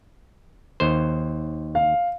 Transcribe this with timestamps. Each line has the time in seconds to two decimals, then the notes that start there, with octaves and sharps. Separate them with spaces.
0.80 D#2 C5
1.75 F5